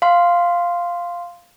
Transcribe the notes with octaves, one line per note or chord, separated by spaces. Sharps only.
F5 C6